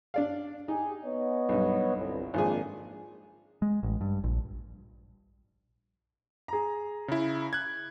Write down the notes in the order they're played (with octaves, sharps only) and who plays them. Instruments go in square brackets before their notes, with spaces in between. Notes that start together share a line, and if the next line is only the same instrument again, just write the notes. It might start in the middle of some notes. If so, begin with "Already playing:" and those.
[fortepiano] D4 D5 F5
[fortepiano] D#4 [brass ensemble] G4 G#4
[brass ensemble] B3 C#5 D#5
[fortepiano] B1 G2
[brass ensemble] G1 C2
[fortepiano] G#1 F3 G#4 [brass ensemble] F2 A#3 D4
[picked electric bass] G#3
A1
G2
A#1
[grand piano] G#4 A#5
[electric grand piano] C#3 E4
F#6 G#6